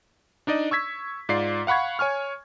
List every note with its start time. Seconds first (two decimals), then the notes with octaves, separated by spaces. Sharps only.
0.47 D4 D#4 D5 D#5
0.71 C#6 E6 G#6 B6
1.29 G#2 F4 D5 C7
1.67 F5 F#5 B5 C#6 G#6
1.99 C#5 G#5 C#6 F6